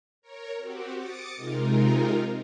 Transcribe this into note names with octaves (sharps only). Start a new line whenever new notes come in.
A#4 C#5
C4 F#4 G4
D6 D#6 A6 C#7
C3 G#3 D#4 F4 A#4